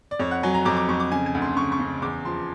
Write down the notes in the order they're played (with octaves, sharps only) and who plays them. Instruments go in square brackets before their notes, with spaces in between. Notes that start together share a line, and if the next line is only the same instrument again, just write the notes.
[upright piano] D5
F2 C#5
F#5
F#3 G#5
A#5
F2 D6
D6
F2 C#6
D6
C#3 G#5
G#5
D2
C6
C#3 C#6
C#6
C#3
E2 D6
F3 C6